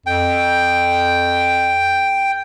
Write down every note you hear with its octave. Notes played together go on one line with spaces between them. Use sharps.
F2 G5